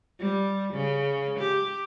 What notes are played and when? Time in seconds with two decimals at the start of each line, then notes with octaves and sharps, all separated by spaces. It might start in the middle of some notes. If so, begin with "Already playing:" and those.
0.19 G3
0.74 C#3
1.39 G4